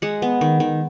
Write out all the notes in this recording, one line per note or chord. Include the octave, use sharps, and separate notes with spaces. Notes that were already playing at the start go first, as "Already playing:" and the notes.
G#3 F#5
B3
D#3
D#3